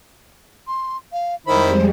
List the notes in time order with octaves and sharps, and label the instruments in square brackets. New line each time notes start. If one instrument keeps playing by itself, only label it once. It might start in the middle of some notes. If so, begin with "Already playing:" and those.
[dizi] C6
F5
[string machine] F2 G3 G#3 [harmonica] D#3 E4 B5 [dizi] C5